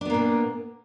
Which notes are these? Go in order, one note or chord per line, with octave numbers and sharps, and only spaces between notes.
A#2 A#3 B3 D4